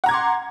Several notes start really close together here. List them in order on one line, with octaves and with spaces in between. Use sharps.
F#5 A#5 G#6 D6 C6